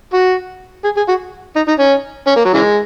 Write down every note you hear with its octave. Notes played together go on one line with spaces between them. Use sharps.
F#4
G#4
G#4
F#4
D#4
D#4
C#4
C#4
A#3
F#3
C#3 E3 G#3